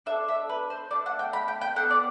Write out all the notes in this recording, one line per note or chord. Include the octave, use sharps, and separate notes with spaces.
D4 A4 E5
E5
B4
C5
A3 D4 G4 D5
F#5
G5
B5
G5
G5
B3 D4 A4 F#5
D5